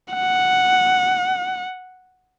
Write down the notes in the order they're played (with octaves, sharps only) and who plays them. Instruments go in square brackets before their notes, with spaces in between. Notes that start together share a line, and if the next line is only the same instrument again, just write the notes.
[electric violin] F#5